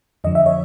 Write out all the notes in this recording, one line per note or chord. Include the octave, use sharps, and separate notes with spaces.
F2 D3 F3 D#5
E5
C#5 D#5